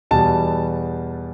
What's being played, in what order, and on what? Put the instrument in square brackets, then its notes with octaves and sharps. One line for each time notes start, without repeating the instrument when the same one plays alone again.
[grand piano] E2 B2 G3 A5